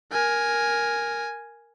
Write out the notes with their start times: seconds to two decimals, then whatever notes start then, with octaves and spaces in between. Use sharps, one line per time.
0.12 A#4 G#5